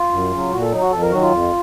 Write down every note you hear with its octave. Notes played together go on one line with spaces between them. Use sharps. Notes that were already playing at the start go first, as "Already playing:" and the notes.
Already playing: F4
F#2
C#3 F#3
A#2 F#4
A4
F#3 D#4
F#4
F2 A4
A#4
D#3 F#3 F#4
F4
F2